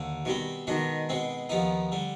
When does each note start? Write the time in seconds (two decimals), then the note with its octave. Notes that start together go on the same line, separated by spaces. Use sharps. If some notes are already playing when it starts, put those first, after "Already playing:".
Already playing: D#2 D3
0.25 B2 D#3 G3 C4
0.67 B2 D#3 G#3 D4
1.09 B2 G#3 C4
1.49 D#2 D#3 F3 B3 D#4
1.92 D3 G3